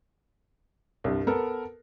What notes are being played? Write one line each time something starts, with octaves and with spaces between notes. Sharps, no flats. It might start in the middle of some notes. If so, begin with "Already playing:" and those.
C2 G2
B3 A4 A#4